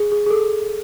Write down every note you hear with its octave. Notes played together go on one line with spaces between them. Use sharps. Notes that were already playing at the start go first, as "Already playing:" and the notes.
Already playing: G#4
G#4
G#4
A4